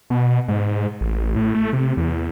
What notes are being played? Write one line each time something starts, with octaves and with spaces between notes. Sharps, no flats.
B2
G#2
A1
A2
A3
C3
E2